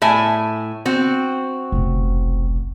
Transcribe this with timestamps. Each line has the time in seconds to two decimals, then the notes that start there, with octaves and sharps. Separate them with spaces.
0.02 A2 E5 G#5
0.86 C4 F#4
1.72 F1 B1